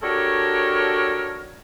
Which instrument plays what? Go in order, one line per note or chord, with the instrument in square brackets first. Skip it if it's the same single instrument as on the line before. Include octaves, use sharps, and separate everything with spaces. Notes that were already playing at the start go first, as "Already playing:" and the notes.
[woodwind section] D4 F#4 G4 A4 A#4 C#5